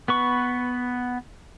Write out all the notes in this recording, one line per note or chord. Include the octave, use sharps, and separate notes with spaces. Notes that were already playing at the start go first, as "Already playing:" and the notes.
B3 B4 C#6